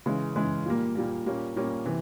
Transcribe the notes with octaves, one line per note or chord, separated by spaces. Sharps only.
C#3 E3 G#3
C#3 E3 G#3
A#2 G3 A#3
A#2 G3 A#3
A#2 G3 A#3 C#4
A#2 G3 A#3 C#4
C3 E3